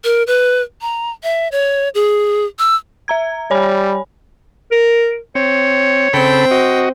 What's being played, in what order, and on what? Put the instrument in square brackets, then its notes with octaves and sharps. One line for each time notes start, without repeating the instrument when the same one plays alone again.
[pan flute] A#4
B4
A#5
E5
C#5
G#4
E6
[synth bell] E5 A#5 G#6
[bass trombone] G3 [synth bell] C#5 G#5 B5
[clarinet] A#4
[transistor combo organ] C4 [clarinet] C#5
[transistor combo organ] C#3 A4 B5 [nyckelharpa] C4 G5
[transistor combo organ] F#4 D#5